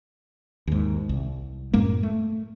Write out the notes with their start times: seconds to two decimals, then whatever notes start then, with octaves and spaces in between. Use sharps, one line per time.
0.67 D#2 G#2
1.09 C2
1.73 F#2 A2 G#3 A#3
2.03 A3